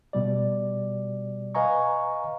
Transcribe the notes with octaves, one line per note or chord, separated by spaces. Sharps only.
B2 G3 D5
B4 D#5 F5 G#5 A#5 C#6